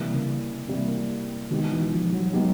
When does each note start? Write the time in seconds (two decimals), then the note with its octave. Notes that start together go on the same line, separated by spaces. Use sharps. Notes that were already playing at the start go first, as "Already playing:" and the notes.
Already playing: C3 E3 G3 A#3
0.13 C#3
0.68 C3 E3 G3 A#3
1.50 B2 D#3 G#3 B3 D#4 G4
1.71 E3
1.91 F3
2.12 F#3
2.33 B2 F#3 G#3 B3 D#4 G4